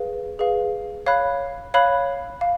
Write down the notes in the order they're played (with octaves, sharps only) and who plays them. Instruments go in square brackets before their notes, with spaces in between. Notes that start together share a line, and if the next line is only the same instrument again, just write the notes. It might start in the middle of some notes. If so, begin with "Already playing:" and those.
Already playing: [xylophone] G#4 B4 F5
G#4 B4 F5
C#5 F5 B5 F#6
C#5 F5 B5 F#6
F5